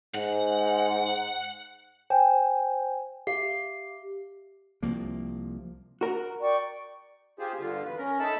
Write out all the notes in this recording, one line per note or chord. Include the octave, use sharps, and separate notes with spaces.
G#2 F#5
C5 G5 G#5
G4 E5 F5 C7
C2 F3 A#3
F#4 A#4
D5 G5 C#6
F4 G4 G#4 C5
G2 D3 F4
E2 B4
C#4 A#4
D#4 A4 E5 A5 B5